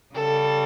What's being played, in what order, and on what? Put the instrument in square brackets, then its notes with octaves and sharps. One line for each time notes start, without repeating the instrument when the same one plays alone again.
[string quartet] C#3 G3 A4